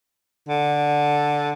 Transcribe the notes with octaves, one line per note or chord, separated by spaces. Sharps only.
D3